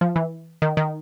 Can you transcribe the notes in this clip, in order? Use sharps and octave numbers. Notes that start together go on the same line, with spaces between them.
F3
E3
D#3
D#3